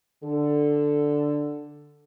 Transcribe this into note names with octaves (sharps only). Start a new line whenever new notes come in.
D3 A4